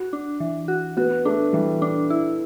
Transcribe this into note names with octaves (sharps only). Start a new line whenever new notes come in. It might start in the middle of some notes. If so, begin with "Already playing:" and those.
Already playing: F#4
D4
E3
F#4
B3 F#4
A3 D4
E3 G3
D4
E4